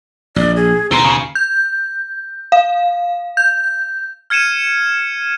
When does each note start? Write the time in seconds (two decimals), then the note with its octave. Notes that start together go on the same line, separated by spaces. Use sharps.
0.36 A#1 D5
0.57 G#4
0.91 D#2 B2 C4 C5 A#5
1.05 C#3
1.35 G6
2.52 F5
3.37 G6
4.30 F6 G#6 C#7 D#7 E7